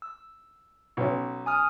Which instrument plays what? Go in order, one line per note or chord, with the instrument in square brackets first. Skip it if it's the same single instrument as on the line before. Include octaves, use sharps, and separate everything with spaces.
[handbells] E6
[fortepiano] B1 C#4
[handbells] G#5 D#6 F6